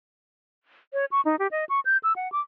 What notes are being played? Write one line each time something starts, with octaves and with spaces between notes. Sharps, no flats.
C#5
C#6
D#4
G4
D#5
C#6
G6
E6
F#5
D6